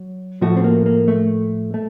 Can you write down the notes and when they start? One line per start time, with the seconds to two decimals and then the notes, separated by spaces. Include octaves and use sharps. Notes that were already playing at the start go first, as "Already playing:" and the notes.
Already playing: F#3
0.41 A2 F3 A3 F#4
0.57 C4
0.64 A#3
0.86 A#3
1.08 A3
1.74 A3